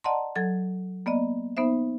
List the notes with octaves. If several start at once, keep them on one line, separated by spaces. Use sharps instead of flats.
D5 D#5 F#5 A5 A#5 C6
F#3 A4 G#6
A#3 B3 D5 D#5
B3 D#4 C5 E5